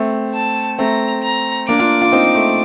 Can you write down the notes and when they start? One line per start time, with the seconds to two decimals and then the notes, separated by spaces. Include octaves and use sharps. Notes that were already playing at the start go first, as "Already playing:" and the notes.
Already playing: A3 C4
0.35 A5
0.79 A3 C4 A#5
1.23 A#5
1.68 A#3 D4 D6
1.79 D4 F4
2.01 D4 F4
2.12 C4 D#4
2.35 A3